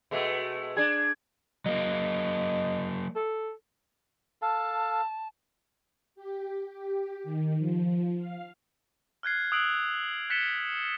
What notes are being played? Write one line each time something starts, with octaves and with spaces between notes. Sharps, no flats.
B2 G#3 A3
D4 G#4 G#6
F#3 A#3 D#5
A4
A4 F5 A5
G4
G4
D#3
F3
F5
F6 F#6 G#6 C7
D#6 E6 F#6 C7 D7 F#7
F#6 A6 B6 C#7 E7 G7